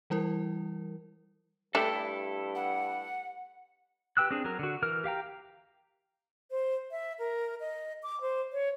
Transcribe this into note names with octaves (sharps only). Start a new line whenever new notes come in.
E3 G3 E4 A#4
G2 G3 A3 E4 A4
F#5
G4 B4 G5 E6 F#6
C4 D4 G#4
F#3 A#4
D3 F#4
E3 A#4 F6
G4 F5 G5 A#5
C5
E5
A#4
D#5
D6
C5
C#5